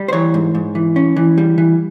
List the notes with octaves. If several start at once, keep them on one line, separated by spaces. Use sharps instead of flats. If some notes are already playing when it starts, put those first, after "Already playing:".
Already playing: G3
C5
E3 C#5
G#2
G#2
E3
C#4
E3
G3
E3